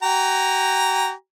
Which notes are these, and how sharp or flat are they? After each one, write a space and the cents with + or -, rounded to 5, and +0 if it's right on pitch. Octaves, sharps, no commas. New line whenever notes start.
F#4 +45 G5 +40 A#5 +0